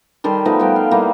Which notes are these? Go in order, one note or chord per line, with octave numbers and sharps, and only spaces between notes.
D#3 G3 A4 C6
F3 A3 B3 D#4
G3 B3 G5
F5
G3 A#3 D#4 E4